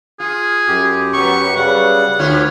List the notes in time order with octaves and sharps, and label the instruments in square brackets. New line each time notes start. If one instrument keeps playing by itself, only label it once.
[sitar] F4 [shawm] G#4
[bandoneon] F#2 G4
[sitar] F#3 B3 [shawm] C#6
[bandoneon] C#3 G3 [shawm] F#5
[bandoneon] D2 C#5 F6 [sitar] D3 E4 F4